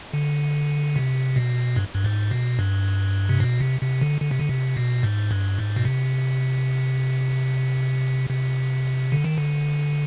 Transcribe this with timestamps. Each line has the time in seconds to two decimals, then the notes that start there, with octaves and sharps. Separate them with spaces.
0.14 D3
0.96 C3
1.36 B2
1.76 G2
1.95 G2
2.04 G#2
2.31 B2
2.59 G2
3.29 C3
3.40 B2
3.61 C3
3.82 C3
4.01 D3
4.22 D3
4.31 C3
4.39 D3
4.49 C3
4.76 B2
5.03 G#2
5.31 G2
5.59 G#2
5.76 B2
5.85 C3
8.30 C3
9.12 D3
9.24 D#3
9.38 D3